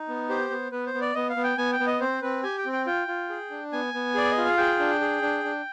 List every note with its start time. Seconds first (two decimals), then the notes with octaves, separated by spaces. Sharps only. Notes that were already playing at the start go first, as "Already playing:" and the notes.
Already playing: D#4
0.08 B3
0.29 G4 C5
0.50 B3
0.72 B3 B4
0.86 C5
0.94 B3
1.01 D5
1.15 B3 D#5
1.29 F5
1.36 B3
1.44 G5
1.58 B3 G#5
1.73 G5
1.80 B3
1.87 D#5
2.00 C4 C5
2.22 C4 B4
2.43 G4 G#5
2.58 G5
2.65 C4
2.72 G5
2.86 F4 G5
3.08 F4
3.29 G#4
3.50 D4
3.72 B3 G#5
3.94 B3
4.15 G#4 D5
4.31 D#5
4.37 F4
4.45 F5
4.57 G#4 G5
4.79 D4
5.01 G#4
5.22 D4
5.44 D4